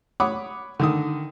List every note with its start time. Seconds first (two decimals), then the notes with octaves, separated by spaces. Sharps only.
0.20 C#5 F#5 B5 D6 D#6
0.80 D3 D#3 D#6